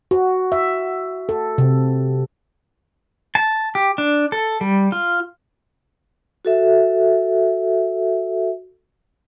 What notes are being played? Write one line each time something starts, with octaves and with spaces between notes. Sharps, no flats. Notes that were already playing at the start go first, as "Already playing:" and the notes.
F#4
E5
A4
C3
A5
G4
D4
A4
G3
F4
F#4 A4 E5